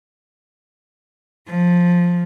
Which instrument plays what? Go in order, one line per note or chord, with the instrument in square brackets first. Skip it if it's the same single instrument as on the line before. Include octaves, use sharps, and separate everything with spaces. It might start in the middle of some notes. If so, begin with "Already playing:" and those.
[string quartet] F3